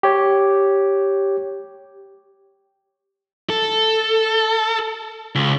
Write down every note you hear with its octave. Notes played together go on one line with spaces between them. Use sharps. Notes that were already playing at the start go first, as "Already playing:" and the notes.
G4 C#5
A4
C#2